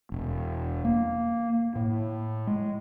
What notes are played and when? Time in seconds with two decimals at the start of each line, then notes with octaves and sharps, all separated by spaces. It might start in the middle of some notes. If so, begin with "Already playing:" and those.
0.12 E1
0.84 A#3
1.75 A2
2.47 G#3